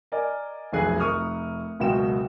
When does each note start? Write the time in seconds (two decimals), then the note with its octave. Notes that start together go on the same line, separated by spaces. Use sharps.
0.12 A#4 D5 D#5 G#5
0.72 F1 B1 F2 G#4 G#5 F#6
1.00 F1 A#4 C#6 D#6 F6
1.80 F#1 C#2 B2 F#4 G5 E7